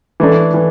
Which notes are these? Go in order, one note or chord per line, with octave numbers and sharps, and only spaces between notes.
E3 A3 D4
E3